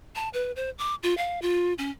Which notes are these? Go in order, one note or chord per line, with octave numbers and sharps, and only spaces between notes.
A5
B4
C5
D6
F4
F5
F4
C#4